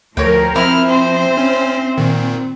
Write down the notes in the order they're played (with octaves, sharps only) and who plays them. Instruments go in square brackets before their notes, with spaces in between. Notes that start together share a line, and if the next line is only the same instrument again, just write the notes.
[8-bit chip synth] D2 [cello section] F3 A#4 [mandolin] C#5 G5
[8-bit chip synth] F3 [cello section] C4 [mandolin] E4 [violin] F6
[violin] C5
[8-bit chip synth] C#4
A#2 D#3